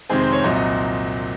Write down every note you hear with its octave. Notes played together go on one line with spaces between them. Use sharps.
F2 C3 D#3 G#3 C4 G#4
C5
C#5
C2 A#2 F#3 C4 D#5
D#5